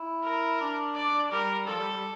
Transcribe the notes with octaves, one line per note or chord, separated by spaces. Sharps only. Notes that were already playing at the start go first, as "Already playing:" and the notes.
Already playing: E4
A#4
D4
D5
G3 A#4
F3 A4
G3
G3